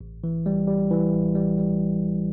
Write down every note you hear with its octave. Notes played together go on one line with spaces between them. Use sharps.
A1
E3
G3
G3
E3
A1
G3
G3